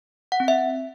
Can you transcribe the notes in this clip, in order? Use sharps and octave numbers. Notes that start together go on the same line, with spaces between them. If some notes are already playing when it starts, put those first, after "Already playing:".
F#5
C4
E5